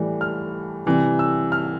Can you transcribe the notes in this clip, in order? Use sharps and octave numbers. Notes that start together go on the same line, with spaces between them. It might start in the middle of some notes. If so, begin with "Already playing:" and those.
Already playing: A2 E3 G3
F6
C3 E3 G3
E6
F6